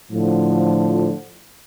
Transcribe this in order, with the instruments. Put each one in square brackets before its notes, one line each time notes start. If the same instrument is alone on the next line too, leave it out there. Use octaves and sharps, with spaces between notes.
[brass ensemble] A2 D3 F3